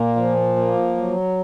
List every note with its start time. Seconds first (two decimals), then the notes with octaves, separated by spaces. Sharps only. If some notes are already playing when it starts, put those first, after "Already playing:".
Already playing: A#2 A#3
0.16 F3
0.56 A#3
0.97 F#3